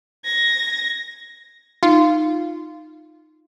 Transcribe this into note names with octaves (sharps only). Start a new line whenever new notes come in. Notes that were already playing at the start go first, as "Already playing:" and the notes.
G#6 A#6
D#4 F4